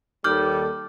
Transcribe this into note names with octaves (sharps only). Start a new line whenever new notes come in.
D#2 G3 A4 D6 F6 G6